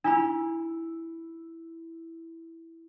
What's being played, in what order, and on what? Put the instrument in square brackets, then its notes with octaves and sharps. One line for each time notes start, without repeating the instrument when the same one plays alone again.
[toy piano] D4 F4 B5 [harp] E4